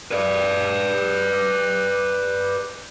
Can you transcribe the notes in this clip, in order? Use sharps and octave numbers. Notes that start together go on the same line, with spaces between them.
B4 D5